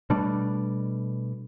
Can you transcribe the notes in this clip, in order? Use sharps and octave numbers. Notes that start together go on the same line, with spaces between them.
B2 G3 A3 D4